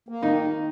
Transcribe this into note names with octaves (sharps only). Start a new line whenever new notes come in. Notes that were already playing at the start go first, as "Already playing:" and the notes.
A#3
D#3 D#4